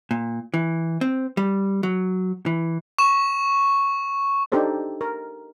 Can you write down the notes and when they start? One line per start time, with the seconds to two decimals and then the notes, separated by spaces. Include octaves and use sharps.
0.11 A#2
0.54 E3
1.01 C4
1.37 G3
1.83 F#3
2.46 E3
2.98 C#6 E7
4.52 D4 D#4 G4 A4 C5 D5
5.01 A#4